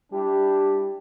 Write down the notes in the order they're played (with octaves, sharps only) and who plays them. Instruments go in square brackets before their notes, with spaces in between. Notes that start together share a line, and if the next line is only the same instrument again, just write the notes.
[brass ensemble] G3 D4 E4 G4